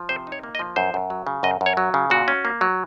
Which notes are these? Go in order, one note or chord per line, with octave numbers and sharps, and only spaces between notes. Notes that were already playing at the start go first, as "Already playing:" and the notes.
Already playing: F3
C3 C5
D#4
C#5
A#3
D#5
F3
F#2 C5
F#2
F#3
C#3
F#2 D#5
F#2
C#5
F#3
C#3
A#2 F#4
C#4
A#3
F#3